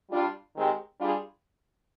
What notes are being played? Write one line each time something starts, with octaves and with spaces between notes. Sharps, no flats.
G3 D4 F4
D#3 G#3 C4 G4
G3 D4 F4 G#4